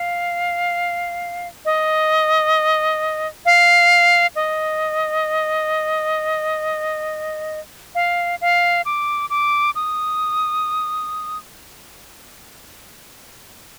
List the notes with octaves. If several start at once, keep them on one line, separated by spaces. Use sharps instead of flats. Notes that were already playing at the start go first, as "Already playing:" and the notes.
Already playing: F5
D#5
F5
D#5
F5
F5
D6
D6
D#6